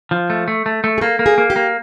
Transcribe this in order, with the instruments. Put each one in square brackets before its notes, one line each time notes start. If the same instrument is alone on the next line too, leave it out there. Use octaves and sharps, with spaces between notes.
[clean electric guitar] F3
A3
A3
A3
A3
[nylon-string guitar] G#4
[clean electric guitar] A#3 [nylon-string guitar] A4
[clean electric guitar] A#3
[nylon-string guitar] G#4
[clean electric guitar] A#3
[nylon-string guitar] G4
[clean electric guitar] A#3